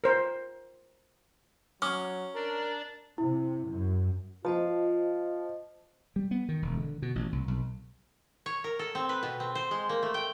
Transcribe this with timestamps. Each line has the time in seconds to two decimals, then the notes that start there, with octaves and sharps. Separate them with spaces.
0.04 A#4 C5
1.82 F#3 C#4 D6 D#6 F6
2.35 D4 A#4 D5
3.18 C3 E4
3.69 F#2
4.45 F3 F4 C5 D#5 A5
6.16 G3
6.31 B3
6.49 D#3
6.62 E1
6.77 D3
7.02 B2
7.15 A1
7.32 C2
7.48 B1
8.46 C#5
8.64 A#4
8.79 A4
8.95 C4
9.09 B4
9.23 B2
9.40 C4
9.55 C5
9.71 G#3
9.89 A#3
10.03 A3
10.14 G5